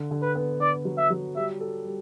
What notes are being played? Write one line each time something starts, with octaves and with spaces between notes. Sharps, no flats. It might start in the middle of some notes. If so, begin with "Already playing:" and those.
Already playing: D3
D3
B4
B3
D3 D5
F#3
E5
F#3
G3 E5
A4
G3